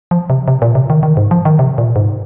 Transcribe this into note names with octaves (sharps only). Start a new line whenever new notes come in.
F3
C3
C3
A#2
C3
D#3
D#3
G#2
F3
D#3
C3
A#2
G#2